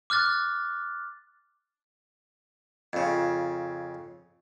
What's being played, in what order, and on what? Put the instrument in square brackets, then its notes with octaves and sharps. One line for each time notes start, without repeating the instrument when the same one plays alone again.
[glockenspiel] D6 F6 F#6 A6
[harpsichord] F2 C#3